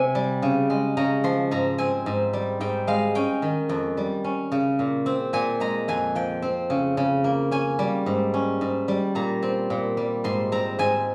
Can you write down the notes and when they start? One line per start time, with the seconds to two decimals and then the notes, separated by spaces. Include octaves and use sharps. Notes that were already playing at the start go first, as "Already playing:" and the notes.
Already playing: C3 C4 G#5
0.15 G3
0.42 C#3
0.70 G#3
0.97 C#3 A#5
1.24 F3 C6
1.51 G#2 A#5
1.78 C4 G#5
2.06 G#2
2.33 G3
2.60 G#2 G5
2.87 G#3 F5
3.15 C#4 G5
3.42 D#3
3.69 F2
3.97 G3
4.24 C#4
4.52 C#3
4.79 A#2
5.06 C4
5.33 A#2 G#5
5.60 G#3 A#5
5.88 F2 G#5
6.15 F3 G5
6.42 C4
6.70 C#3
6.97 C#3
7.24 A#3
7.51 C#4 G#5
7.79 G3
8.06 G#2
8.34 C#4
8.61 G#2
8.88 G3
9.15 A#2 A#5
9.42 C4
9.70 A#2
9.97 G3
10.24 G#2 C6
10.52 C4 A#5
10.79 G#2 G#5